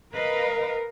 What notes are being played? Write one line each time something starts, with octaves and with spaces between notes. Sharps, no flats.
A#4 B4 D#5 F5